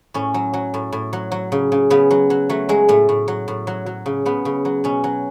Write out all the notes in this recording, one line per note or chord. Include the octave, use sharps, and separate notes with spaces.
A2 C#4
F#3
F#3
A2
A2
F#3
F#3
C#3
C#3
C#3 B3
F#3
F#3
F#3 A3
F#3 G#3
A2 A3
A2
F#3
A2
F#3
F#3
C#3
C#3 B3
C#3
F#3
B2 C#4
F#3